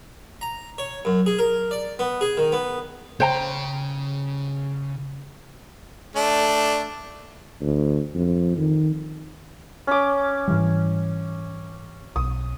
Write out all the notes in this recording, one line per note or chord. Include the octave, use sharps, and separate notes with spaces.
A#5
C#5
F#2
G#4
A#4
D5
B3
G#4
D#3
B3
C#3 C5 G5 A#5
A3 D4
D2
F2
D#3
C#4 D6
G#2 E3 G3
B1 D#6